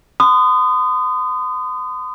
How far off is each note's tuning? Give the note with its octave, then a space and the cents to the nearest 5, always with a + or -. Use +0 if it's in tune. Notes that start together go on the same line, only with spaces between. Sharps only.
C6 -45 D#6 -15